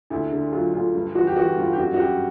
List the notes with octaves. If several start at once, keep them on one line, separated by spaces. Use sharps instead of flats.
D2 E4
D3
F#3 F4
D2 F4
G2
E3 F#4
G4
E3 F#4
G2 F4
G4
F#2 F#4
F#4
F#2 G4